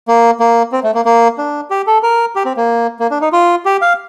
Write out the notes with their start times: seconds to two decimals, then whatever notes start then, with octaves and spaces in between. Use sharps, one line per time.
0.08 A#3
0.40 A#3
0.72 C4
0.84 A3
0.94 A#3
1.05 A#3
1.38 D4
1.70 G4
1.87 A4
2.03 A#4
2.36 G4
2.45 C4
2.57 A#3
3.00 A#3
3.11 D4
3.21 D#4
3.33 F4
3.65 G4
3.82 F5